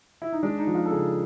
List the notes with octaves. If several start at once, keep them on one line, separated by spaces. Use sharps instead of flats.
E4
D#4
G#3 D4
D#4
F3
F4
A4
C#3 G#4